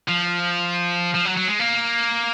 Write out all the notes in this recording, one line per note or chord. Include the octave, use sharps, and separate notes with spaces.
F3
F3
F#3
F#3
G#3
A#3